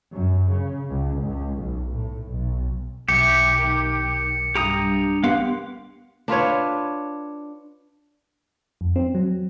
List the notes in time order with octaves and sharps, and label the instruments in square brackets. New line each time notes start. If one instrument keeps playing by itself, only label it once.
[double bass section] F#2
C#3
C#2
C#2
B1
A2
B1
[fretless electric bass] B1 [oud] E3 [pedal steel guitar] G4 [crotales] C#7
[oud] D#3
[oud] G2 [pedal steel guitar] G4 A#5 D#6
[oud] A#3 G4 [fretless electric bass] B3 [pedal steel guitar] F5 F#5 C6
[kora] D4 F4 B4 C#5
[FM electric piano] F2
C4
F#3